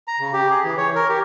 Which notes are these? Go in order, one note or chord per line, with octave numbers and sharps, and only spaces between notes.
A#5
C#3
G4
G#4
E3
C#5
A#4
G4